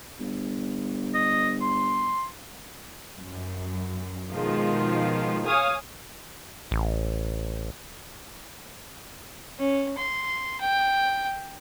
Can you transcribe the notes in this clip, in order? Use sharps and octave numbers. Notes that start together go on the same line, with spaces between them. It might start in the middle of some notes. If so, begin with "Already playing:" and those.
G1
D#5
C6
F#2
B2 D#3 F3 G#3 F4
C#5 F5 G#5 D#6
A1
C#4
C6
G5